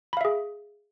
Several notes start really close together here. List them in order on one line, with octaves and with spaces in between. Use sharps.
B5 F5 E5 G#4